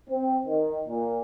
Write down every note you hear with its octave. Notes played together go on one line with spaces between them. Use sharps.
C4
D#3
A#2